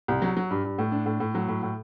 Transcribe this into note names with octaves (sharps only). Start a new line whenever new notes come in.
C2
F#3
F#3
G2
G2
A2
D4
A2
A2
F#3
A2
A2